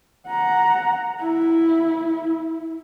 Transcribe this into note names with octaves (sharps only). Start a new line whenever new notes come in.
F#5 A#5
E4